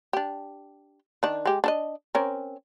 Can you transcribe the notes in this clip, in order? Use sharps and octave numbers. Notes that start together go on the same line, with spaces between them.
D4 G4
D#3 D4
G#3 G4
D4 A4 D#5
C4 C#4 A#4